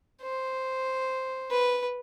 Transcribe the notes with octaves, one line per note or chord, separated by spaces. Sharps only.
C5
B4